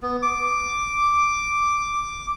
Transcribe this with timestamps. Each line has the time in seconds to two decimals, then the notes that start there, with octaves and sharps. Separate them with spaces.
0.02 B3
0.22 D6